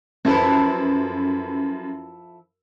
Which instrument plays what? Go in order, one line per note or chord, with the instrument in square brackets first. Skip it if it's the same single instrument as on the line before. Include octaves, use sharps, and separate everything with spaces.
[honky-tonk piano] F#2 B4 [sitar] F3 E4 A4